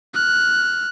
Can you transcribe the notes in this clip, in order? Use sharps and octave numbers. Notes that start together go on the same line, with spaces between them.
F6 F#6